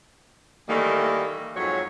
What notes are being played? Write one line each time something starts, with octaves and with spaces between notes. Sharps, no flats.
D#3 E3 G3 A3 A#3
F2 G#2 F#3 C#5